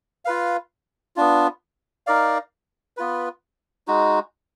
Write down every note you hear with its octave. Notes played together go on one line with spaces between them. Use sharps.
F4 B4 F5
B3 D4 F4
D#4 A#4 D5 F5
B3 F4 B4
G#3 D#4 F#4